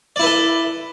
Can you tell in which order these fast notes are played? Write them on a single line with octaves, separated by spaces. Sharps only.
D5 E4 B4 A4